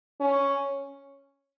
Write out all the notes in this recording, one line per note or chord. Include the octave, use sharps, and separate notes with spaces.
C#4